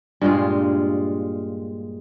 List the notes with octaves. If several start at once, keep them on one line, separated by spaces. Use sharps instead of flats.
G2 A#2 G#3 F4